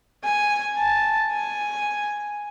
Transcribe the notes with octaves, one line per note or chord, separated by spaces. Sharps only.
G#5
A5
G#5